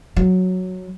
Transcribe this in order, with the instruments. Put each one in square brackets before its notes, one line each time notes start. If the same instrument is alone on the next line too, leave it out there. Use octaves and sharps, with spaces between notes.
[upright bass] F#3